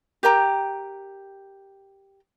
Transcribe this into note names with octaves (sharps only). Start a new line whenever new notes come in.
G4 A#4 G5 A#5